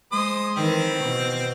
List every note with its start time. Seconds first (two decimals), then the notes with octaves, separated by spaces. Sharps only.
0.12 G#3 C5 D#6
0.56 D#3 E3 C4
1.04 B2